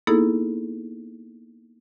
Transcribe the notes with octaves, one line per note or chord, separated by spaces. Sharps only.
A#3 B3 D#4 E4 G#4 A4